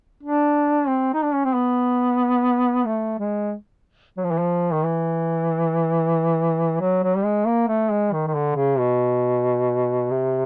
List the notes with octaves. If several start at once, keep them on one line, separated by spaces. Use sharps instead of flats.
D4
C4
D#4
D4
C#4
C4
B3
A3
G#3
F#3
F3
E3
F3
D#3
E3
F#3
F#3
G3
G#3
A#3
A3
G#3
D#3
D#3
D3
C#3
B2
C3